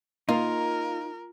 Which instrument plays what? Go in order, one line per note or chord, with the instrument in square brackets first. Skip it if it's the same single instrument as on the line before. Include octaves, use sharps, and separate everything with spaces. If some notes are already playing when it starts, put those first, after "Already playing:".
[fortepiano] A#3 [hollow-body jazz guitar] D#4 [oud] F4 [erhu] A#4